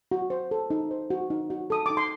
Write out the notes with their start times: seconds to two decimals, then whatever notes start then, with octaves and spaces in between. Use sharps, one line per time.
0.11 F#4
0.30 C5
0.51 A4
0.70 D#4
0.91 C5
1.10 F#4
1.30 D#4
1.50 F#4
1.70 A4 D#6
1.86 D#4 D6
1.97 C6